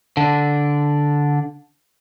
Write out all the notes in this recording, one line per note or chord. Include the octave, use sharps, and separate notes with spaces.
D3 D4